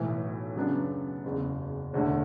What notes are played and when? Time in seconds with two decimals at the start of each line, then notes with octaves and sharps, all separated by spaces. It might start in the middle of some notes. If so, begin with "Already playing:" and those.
Already playing: B1 A2 E3
0.56 F#2 C#3 F#3 B3 D4
1.24 F#1 E2 C#3
1.93 E1 E2 D3 A3